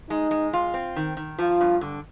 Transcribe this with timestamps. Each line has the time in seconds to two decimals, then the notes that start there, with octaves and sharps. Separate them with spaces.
0.10 G#3 D#4
0.31 G#3
0.53 F4
0.74 C4
0.96 D#3
1.17 D#3
1.39 F3 F4
1.61 G2
1.81 D3